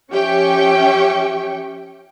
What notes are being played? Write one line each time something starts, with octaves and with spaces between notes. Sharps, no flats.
F3 C#4 G4 E5 G5 C#6